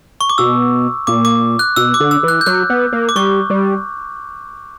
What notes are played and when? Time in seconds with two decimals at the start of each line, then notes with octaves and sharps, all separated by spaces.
0.21 C#6
0.30 D6
0.38 B2 E6
1.07 A#2 D6
1.25 D6
1.59 F#6
1.76 B2 E6
1.94 D6
2.00 D3
2.11 E6
2.23 E3
2.28 F#6
2.41 G6
2.46 F#3 F#6
2.69 B3
2.92 A#3
3.09 D6
3.16 G3 C#6
3.50 G3